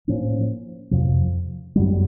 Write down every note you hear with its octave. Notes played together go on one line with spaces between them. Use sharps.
A2 F3 A#3 C#4
F2 C3 F3
F#2 D3 G3